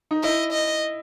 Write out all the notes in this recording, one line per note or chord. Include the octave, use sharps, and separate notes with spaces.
D#4
E4 D#5
D#5